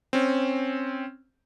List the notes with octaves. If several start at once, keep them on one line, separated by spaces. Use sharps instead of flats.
C4 C#4